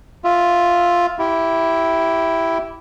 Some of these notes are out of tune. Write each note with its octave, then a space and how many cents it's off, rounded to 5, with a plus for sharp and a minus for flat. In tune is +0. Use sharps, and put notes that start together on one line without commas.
F4 +5 E5 +0
E4 +0 G4 -15